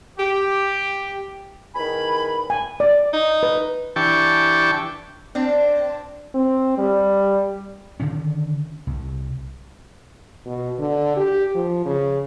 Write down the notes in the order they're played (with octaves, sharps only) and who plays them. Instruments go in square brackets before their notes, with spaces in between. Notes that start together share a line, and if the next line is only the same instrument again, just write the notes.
[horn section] G4
[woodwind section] E2 D#3 G#5 B5
[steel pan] G#5
D5
[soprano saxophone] D#4
[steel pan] B4
[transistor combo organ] E3 D4 G4 G5 A5 C#6
[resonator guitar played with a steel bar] C4 D4
[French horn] C4
G3
[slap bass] D3 D#3 C#4
C2
[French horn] B2
D3
G4
F3
C#3